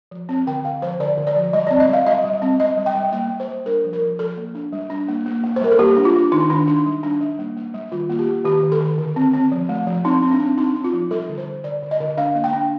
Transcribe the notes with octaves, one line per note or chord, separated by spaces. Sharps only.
F3
C4
D3 G5
D3 F5
F3 C5
D3 D5
D3
D5
F3
G3 D#5
D5
C4
D#5
G3 F5
G3 D#5
G3
C4
G3 D#5
G3
G5
G3
A#3 G5
G3
C5
G3
D4 A#4
F3
A#4
F3
F3 A4
A#3
D4
G3
D4
A#3
A#3
A#3
C5
G3 A#4
A4
A#3 G4
D4
F4
D4
D#3 D#4
D#3 D4
D4 D#4
G3
D4
G3
A#3
A#3
G3
D#3 F4
A#3 F4
G4
A#3
D#3 G4
D#3
A4
D#3
D3
C4
C4
F3
A3
F3
C4 D#4
C4
D4
C4
C4 D#4
C4
F4
F3
G3 A4
D3
C5
D3
D3 D5
D3
D#5
D3
D4 F5
A#3
G5
D4